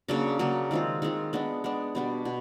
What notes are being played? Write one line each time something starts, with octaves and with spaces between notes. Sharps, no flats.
C#3 F#3 A#3 D4
C#3 F#3 A#3 D4
D#3 G#3 C4 F4
D#3 G#3 C4 F4
G#3 B3 D4
G#3 B3 D4
B2 G3 B3 D4
B2